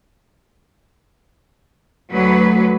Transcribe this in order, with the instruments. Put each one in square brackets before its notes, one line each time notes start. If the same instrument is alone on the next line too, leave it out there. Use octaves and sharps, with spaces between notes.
[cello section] D2 F#3 B4